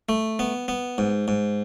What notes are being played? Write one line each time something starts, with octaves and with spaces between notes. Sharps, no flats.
A3
B3
B3
G#2
G#2